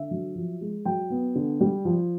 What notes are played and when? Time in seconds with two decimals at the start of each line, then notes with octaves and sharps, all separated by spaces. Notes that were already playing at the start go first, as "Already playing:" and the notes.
Already playing: D3 E5
0.11 F#3
0.35 F3
0.61 G#3
0.85 F#3 G5
1.10 B3
1.35 D3
1.61 G3
1.85 F3